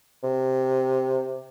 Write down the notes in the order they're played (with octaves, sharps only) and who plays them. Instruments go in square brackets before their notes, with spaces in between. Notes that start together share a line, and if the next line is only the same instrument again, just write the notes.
[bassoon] C3